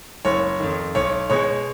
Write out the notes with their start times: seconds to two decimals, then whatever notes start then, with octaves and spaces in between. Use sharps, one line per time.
0.25 F#1 C#5
0.60 F2 D#3
0.95 B1 C#5
1.30 B2 G#3 C#5